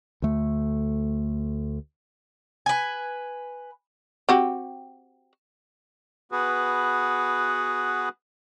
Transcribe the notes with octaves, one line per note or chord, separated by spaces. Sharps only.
D2 A3
B4 G#5
C4 F#4 G4
B3 F#4 G#4 B4